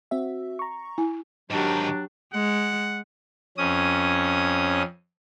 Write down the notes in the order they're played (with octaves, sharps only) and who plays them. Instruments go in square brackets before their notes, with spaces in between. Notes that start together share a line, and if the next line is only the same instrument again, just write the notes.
[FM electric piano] C4 F#4 E5
A#5 C#6
[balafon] E4 G#5
[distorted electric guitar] G#2 D#3 [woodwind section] F#3 D4 [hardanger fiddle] F#4 G4
[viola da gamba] G#3 [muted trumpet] F#5
[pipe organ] F2 C#4 D#6